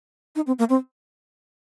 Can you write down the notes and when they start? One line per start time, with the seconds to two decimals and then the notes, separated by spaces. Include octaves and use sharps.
0.36 D#4
0.47 C4
0.59 A#3
0.69 C4